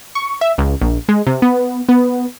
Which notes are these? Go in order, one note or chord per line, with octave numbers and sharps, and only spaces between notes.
C#6
E5
C#2
A#1
G#3
C3
B3
B3